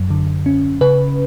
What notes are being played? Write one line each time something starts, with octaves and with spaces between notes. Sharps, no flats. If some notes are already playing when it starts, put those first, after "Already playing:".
Already playing: F#2 F#3
D3
C#4
C#3 B4